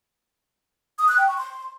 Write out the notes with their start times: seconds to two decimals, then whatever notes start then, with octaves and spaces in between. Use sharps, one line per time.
0.99 D#6
1.08 F#6
1.18 G5
1.28 C#6
1.38 C6